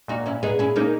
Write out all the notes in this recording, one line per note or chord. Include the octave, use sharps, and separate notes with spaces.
A#2 D#4 F#4
C#4 E4
B3 D#4 G#4
C#4 E4
A#3 C#4 D#4